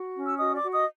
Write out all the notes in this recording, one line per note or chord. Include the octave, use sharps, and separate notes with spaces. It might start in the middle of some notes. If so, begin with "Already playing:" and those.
Already playing: F#4
C#4
E6
F#4 D#5 D#6
D5 D6
F#4
D#5 D#6